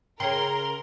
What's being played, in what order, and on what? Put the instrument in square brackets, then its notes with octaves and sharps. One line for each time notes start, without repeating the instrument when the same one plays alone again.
[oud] C#3 [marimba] G#4 C#5 G5 [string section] A#4 [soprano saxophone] C6